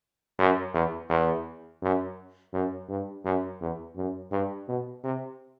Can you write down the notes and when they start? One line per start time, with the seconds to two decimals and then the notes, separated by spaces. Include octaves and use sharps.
0.39 F#2
0.74 E2
1.10 E2
1.82 F#2
2.54 F#2
2.89 G2
3.25 F#2
3.61 E2
3.97 F#2
4.32 G2
4.68 B2
5.04 C3